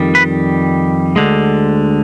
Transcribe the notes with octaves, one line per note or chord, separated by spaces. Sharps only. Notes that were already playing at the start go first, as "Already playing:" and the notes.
Already playing: F2 D#3 G3
B4
D2 D3 G#3